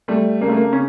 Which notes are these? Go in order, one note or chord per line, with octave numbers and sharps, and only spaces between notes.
G3 A3
C#3 A#3
A3
A#3
C#3 C#4